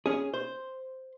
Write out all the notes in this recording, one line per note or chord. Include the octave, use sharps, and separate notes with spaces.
C#4 G#4
C5